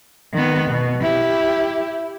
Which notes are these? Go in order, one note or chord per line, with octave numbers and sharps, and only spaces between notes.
D#3 B3
B2
E4 G4